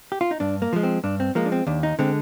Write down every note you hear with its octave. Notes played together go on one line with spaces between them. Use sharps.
G4
F4
D#4
G2 D4
A#3
F3 G#3
C4
G2 D4
C4
F3 G#3 A#3
D4
C4
D#2 D4
D#4
D3 G#3 C4